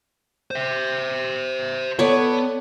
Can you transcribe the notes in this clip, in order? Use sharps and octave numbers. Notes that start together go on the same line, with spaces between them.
C5 E5
B3 A4 C#5 D5